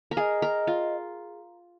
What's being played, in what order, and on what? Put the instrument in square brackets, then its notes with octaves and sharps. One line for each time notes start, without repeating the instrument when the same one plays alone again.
[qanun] A#4
[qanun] G#4 [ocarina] D#5 F5
[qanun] A#4
F4